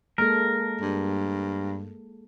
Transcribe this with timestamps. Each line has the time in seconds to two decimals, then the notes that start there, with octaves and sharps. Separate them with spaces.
0.18 G#3 A#3 A4 A#4
0.81 G2